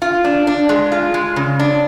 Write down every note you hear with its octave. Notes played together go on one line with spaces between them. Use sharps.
F4
D4
D4
G#3
F4
G#3
C#3
D4